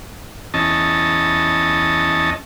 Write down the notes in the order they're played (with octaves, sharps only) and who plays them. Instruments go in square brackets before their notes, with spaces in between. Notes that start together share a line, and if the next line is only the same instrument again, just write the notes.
[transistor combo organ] E2 C#4 D#5 A5